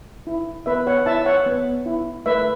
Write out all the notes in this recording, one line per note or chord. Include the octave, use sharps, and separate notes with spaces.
E4
B3 B4 E5
C#5 F#5
E4 E5 A5
C#5 F#5
B3
E4
A3 B4 E5